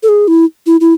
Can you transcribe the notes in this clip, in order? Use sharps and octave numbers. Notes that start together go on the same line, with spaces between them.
A4
G#4
E4
E4
E4